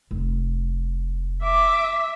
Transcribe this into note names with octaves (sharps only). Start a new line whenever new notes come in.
F1
E5 D6